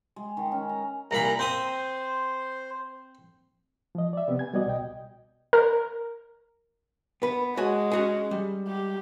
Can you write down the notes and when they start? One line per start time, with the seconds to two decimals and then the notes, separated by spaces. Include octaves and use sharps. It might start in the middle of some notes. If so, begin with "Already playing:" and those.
0.16 G#3
0.37 D#3
0.52 C#4
0.69 A#5
1.11 C2 A#2 A#5 B5
1.39 C4 C5 D#6
3.95 F3 D#5
4.13 D5 E5
4.28 C3 B3 C4 G4
4.39 G#5 G#6
4.53 G3 B3 F#4 D5 D#5
4.66 C2 B2 D#5 G5
5.53 A#4
7.22 B3 B4
7.57 G#3 F#4 C#5 G#5
7.91 C#4 F#4 G#4
8.31 G3
8.67 G4